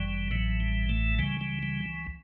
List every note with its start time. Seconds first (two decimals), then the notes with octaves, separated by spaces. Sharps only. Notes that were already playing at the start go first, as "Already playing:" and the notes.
Already playing: G1 F#2 E3 G3
0.31 A1 A2 E3 F#3
0.60 G3
0.89 A2 A3
1.19 C#2 C#3 E3 G3
1.41 G3
1.63 G3